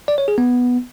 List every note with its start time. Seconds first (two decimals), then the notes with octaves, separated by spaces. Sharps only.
0.08 D5
0.18 C#5
0.28 G#4
0.38 B3